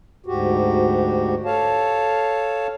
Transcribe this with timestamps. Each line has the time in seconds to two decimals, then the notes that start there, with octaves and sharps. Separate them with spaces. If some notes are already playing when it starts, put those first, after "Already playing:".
0.26 D2 G#2 F#4 G4
1.45 A4 C#5 F5 A5